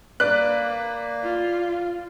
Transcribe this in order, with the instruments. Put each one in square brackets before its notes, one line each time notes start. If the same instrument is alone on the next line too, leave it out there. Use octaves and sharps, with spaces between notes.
[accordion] A#3 [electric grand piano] B4 D5 [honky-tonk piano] F#6
[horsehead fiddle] F4